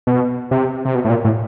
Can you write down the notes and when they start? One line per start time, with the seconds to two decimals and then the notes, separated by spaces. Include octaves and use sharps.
0.07 B2
0.51 C3
0.85 C3
0.95 B2
1.05 A2
1.10 A#2
1.24 A2